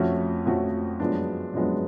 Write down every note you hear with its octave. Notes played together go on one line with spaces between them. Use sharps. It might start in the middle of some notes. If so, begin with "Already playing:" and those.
Already playing: F2 F3 A3 C#4 F#4
F2 F3 A3 C#4 F#4
F#2 F3 G#3 B3 D4
F#2 F3 G#3 B3 D4